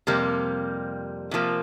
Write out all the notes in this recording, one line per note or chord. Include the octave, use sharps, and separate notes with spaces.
F2 C3 G3 A#3
C3 F3 A#3